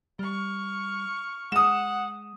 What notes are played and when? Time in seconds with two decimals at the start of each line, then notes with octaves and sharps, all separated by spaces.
0.19 G3 C#6 F6
1.52 G#3 F#5 D#6 E7